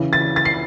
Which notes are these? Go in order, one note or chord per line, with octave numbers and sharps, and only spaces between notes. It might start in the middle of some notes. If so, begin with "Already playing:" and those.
Already playing: C#3 E3
A6
A6
C7